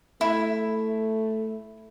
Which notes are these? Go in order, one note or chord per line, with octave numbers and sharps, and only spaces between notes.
A3 E4